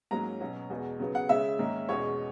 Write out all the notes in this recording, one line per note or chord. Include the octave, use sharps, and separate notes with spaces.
G#2 F#3 A#3 C#4 A#5
B2 F#3 C#4
E2 B2 G#3 B3
C#3 F#3 B3
F#5
C#3 G#3 C#4 E5
G#2 D#3 A#3 C#4
E2 B2 G#3 C#4 C#5